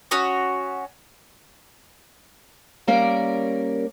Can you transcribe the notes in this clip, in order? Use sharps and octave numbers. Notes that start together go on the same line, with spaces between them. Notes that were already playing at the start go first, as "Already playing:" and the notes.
C#4 F#4 C#5 D#6
G3 A#3 C#4 A#4 D5